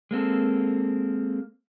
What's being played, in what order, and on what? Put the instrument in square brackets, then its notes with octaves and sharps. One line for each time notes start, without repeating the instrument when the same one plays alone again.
[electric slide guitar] G#3 A#3 C4 A4